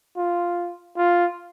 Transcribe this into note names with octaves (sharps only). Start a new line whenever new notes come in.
F4
F4